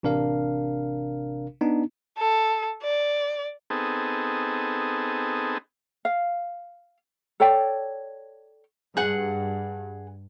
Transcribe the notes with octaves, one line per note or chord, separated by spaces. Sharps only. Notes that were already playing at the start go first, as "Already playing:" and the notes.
A1 C3 D4 A#4 F5
B3 D4 D#4
A4
D5
B3 C4 D#4 G#4 A4
F5
A4 C#5 D5 G5
G2 G#4 F#5